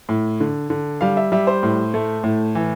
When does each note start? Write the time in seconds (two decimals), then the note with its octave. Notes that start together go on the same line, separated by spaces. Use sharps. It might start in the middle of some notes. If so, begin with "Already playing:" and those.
0.09 A2
0.40 D3
0.70 D3
1.01 G3 F5
1.17 E5
1.32 G3 E5
1.47 C5
1.63 A2
1.94 A3
2.24 A2
2.55 E3